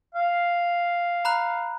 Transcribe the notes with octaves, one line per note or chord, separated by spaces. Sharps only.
F5
A#5 B5 F#6